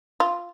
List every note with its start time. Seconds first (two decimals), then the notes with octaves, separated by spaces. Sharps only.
0.20 F4